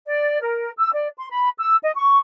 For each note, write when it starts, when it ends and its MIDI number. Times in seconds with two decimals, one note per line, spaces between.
0.07 0.38 74
0.40 0.69 70
0.77 0.89 88
0.92 1.08 74
1.17 1.28 84
1.30 1.49 83
1.57 1.75 88
1.82 1.91 75
1.95 2.17 85